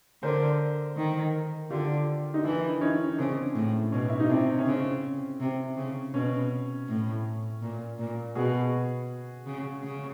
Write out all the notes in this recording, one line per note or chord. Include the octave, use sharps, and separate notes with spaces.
D3 A#4 C5
D#3
D3 F4 G4
D#4
E3 D4 E4
C#4 D#4
C#3 C4 D4
A2
B2 C#4
E4
D#4
C3 C4 D4
C#4
C#3 C4
C3
C#3
B2 C#4
A2
A#2
A#2
B2 F#4 G#4
C#3
C#3